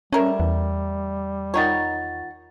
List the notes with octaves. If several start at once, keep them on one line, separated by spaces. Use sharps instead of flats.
G3 A3 C#4 A#4 E5
E2
D#3 D#4 F4 C#5 F#5 A6